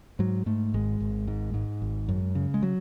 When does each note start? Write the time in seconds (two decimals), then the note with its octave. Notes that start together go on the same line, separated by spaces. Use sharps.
0.19 G#2 F#3
0.46 G#2 A3
0.74 G#1 G#3
1.00 G#1
1.28 G#2
1.54 G#2
1.82 G#1
2.08 F#2
2.35 C#3
2.54 G#3
2.62 F#3